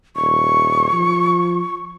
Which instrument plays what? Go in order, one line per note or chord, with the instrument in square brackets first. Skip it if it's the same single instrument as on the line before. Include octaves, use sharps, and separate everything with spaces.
[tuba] D#1 [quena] C#6
[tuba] F3